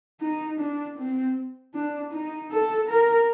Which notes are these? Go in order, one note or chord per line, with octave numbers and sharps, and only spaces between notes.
D#4
D4
C4
D4
D#4
A4
A#4